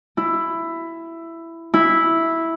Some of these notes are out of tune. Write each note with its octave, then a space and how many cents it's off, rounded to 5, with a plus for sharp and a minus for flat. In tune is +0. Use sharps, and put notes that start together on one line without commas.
E4 +10
E4 -5